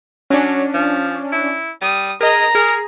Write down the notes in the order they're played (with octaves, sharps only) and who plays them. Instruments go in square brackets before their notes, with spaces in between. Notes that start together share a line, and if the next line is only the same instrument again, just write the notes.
[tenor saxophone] F#3 [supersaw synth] C#4 D4
[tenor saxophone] F3
E4
[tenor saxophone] G3 [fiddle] D#6
[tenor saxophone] G#4 [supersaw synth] A#4 D#5 [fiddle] A#5
[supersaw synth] G#4 [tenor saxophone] A#4